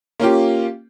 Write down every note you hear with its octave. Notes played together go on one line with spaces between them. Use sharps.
A#3 C#4 F4 G4